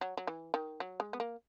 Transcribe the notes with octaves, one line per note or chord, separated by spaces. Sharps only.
F#3
F#3
E3
D#3
F#3
G#3
B3
A#3